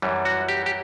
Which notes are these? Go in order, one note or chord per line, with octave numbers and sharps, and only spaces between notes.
F#2 E3 G3
F#4
G4
G4